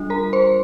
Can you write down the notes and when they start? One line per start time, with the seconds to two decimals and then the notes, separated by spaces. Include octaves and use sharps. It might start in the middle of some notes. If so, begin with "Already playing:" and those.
Already playing: G3 D4 F4
0.10 A#4 A#5
0.33 C5 C6